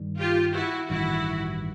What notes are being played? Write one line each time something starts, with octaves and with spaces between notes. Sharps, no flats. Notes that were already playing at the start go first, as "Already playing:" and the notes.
Already playing: G2 D#3 G3
F4 G4
E4 F#4
A1 G2 D#3 E4 F#4